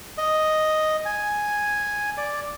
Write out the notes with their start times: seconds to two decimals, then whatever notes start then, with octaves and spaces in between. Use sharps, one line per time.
0.18 D#5
1.06 G#5
2.17 D5